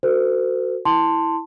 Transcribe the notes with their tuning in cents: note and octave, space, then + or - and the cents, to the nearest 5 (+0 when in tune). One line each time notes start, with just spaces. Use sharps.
F#4 +0 A4 +35 C5 -40
E4 -5 A5 +15 C6 +0